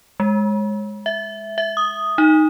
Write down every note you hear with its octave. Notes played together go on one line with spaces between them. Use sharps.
G#3
E5
E5
D#6
D#4